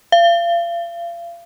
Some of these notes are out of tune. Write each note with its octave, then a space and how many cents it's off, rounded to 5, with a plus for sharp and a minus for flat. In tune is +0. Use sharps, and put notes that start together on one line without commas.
F5 -35